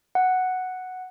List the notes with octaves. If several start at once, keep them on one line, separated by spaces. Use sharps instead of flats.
F#5